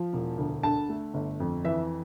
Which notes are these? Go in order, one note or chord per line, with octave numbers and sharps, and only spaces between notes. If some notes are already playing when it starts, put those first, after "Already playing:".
Already playing: F3
E1
D2
D3 A5
A3
G1
F2
E3 E5